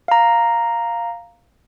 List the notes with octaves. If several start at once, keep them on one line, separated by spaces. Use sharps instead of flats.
F5 A#5